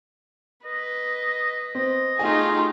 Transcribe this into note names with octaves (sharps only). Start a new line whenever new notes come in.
B4 D#5
C4 D#5
A3 D#4 F4 G4 G#4 G#5